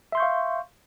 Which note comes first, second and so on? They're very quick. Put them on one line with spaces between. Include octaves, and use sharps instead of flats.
E5 C6 G6 C#6 F5